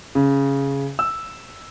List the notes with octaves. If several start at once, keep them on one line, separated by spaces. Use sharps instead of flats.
C#3
E6